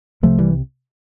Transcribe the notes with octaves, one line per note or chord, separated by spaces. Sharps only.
C2 C3 F3 A3
E3 G3